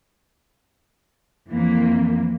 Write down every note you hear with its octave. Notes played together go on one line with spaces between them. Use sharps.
F2 E3 A#3